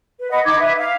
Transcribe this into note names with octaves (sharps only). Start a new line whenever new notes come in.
B4
D#5 F#5 B5 D#6
D#4 D6 G#6
B4 E5
F5